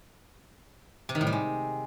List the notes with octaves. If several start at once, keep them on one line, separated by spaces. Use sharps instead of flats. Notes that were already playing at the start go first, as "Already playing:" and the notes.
C3
D#3
A2
G3
G#3